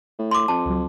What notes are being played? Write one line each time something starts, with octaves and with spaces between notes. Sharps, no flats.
A2
C6 D6
F2 A5
C#2 F#3